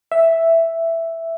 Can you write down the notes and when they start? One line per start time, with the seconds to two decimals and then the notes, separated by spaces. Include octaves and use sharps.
0.12 E5